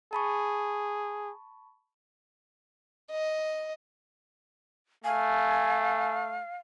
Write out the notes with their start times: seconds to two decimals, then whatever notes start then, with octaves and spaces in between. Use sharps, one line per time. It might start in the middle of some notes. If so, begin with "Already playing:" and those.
0.13 G#4 A5 B5 C#6
3.11 D#5
5.04 A3 F5 G#5